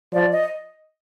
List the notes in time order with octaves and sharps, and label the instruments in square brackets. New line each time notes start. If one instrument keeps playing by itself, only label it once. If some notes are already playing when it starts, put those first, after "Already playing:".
[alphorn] F3 [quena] D5
[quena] D#5